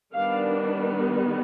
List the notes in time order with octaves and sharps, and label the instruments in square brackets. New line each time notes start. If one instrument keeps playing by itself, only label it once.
[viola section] D#3 G3 B3 D4 F5